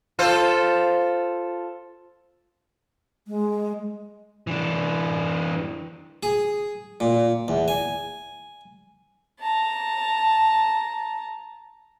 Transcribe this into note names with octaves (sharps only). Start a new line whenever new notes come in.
F4 A4 C5
G#3
E3 D4
G#4
A#2
E2
G#5
A5 A#5